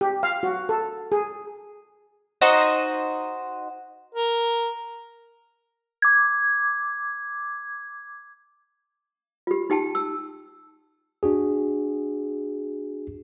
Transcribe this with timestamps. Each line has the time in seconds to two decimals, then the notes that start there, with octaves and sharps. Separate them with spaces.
0.01 G4
0.23 F5
0.43 F#4
0.69 A4
1.12 G#4
2.41 D#4 F#4 C5 D#5
4.15 A#4
6.02 D6 G#6
9.47 F4 G4
9.70 D#4 G4 G5 A5
9.95 E6
11.23 D4 F#4 G#4